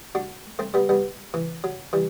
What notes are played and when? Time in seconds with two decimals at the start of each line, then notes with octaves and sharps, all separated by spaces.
0.15 D4 F#4
0.59 A3 C4
0.74 G3 B3
0.89 G3 B3
1.34 E3
1.64 F#3
1.93 E3 G3